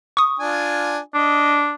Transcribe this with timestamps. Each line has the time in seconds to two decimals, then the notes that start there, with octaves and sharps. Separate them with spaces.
0.17 C#6 D#6
0.39 D4 F4 G#5
1.14 D4 D#5